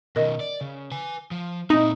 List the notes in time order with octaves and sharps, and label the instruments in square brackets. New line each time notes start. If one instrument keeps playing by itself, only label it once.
[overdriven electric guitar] B2 D#3 [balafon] A#4 D#5
[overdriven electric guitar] D5
C#3
B4 G#5
F3
[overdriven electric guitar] A#2 E4 [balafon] C4 [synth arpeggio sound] D#4